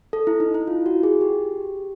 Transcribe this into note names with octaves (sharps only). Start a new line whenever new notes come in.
A4
E4
D#4
E4
F4
F#4
G#4
G4